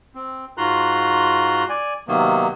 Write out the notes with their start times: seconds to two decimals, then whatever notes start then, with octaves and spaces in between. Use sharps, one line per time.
0.15 C4
0.58 G#2 F4 F#4 A#5 C6 F#6
1.69 D5 G#5
2.08 C3 D#3 F#3 A#3 B3